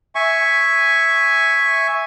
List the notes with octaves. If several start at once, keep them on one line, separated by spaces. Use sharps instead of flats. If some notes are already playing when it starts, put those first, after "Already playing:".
E5 G#5 C#6